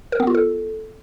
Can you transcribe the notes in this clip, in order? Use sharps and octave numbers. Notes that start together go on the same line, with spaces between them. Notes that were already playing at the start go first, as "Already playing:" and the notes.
A#4
B3
F4
A4